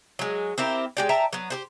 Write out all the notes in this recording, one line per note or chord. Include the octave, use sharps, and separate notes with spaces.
F#3 G#3
C4 E4 G4 A#4
G#3 G4 D5
E5 G5 A5 A#5
F#3 B3
G4 G#4 C5